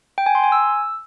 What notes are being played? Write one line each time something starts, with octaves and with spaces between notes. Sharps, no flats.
G5
G#5
C6
G#5
E6